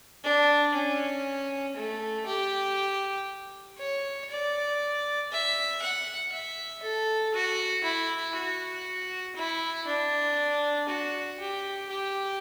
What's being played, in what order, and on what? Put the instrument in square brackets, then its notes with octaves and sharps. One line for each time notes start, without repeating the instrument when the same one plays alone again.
[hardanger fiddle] D4
C#4
A3
G4
C#5
D5
E5
F#5
E5
A4
F#4
E4
F#4
E4
D4
F#4
G4
G4